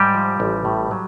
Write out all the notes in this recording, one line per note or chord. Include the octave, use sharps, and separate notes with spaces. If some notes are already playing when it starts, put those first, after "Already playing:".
Already playing: G#2 G3 G4
F3
A1
A2
F#3